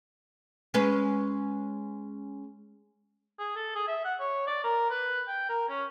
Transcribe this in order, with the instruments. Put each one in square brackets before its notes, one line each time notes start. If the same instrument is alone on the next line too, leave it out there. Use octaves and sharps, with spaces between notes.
[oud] G#3 C#4 B4
[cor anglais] G#4
A4
G#4
E5
F#5
C#5
D5
A#4
B4
G5
A#4
C#4